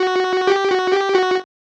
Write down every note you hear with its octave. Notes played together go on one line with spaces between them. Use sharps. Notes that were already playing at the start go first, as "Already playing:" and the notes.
Already playing: F#4
G4
F#4
G4
F#4